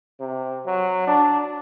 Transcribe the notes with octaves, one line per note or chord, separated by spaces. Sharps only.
C3
F#3
D4